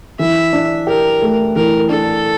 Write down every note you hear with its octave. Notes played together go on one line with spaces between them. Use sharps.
E3 E5
D4
G4 A#4
A3
E3 A#4
D4 A4